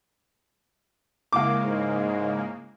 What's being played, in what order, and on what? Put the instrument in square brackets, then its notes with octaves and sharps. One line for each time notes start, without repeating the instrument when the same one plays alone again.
[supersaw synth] C#3 G#3 A#3 [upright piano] E4 F5 [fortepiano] D6
[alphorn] G#2